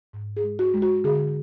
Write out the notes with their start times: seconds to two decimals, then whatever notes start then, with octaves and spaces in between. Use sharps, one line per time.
0.13 G#2
0.37 G#4
0.44 G#3
0.59 F#4
0.74 G#3
0.82 F#4
1.04 D3 G#4